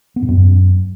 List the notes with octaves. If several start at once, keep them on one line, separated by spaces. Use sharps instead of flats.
B3
G#2
F#2